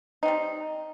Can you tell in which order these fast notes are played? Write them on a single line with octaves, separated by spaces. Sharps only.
D#4 C4 G3